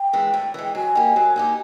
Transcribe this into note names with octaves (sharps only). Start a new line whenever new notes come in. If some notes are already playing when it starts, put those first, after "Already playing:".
Already playing: G5
E3 G#3
A2
E3 G#3
G5
F#3 G#5
A#3 D#4 G4
F#3
A#3 D#4 G4